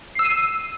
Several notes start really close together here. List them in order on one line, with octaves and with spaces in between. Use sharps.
C7 E6 D#7